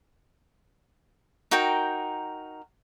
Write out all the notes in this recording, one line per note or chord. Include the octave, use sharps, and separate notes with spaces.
D#4 F#4 A#4 G5